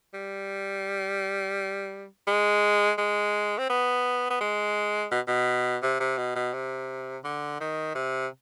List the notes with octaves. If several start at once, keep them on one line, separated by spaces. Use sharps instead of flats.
G3
G#3
G#3
C4
B3
B3
G#3
B2
B2
C3
C3
B2
B2
C3
D3
D#3
C3